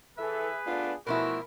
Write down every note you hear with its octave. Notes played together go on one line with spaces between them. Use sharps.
E3 G#4 A4 B4 E5
A3 B3 D4 F4
B2 E3 F3 A3 E4 F#4 A#4